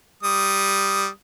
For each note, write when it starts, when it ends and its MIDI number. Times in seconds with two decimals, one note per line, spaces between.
0.23 1.08 55
0.23 1.08 87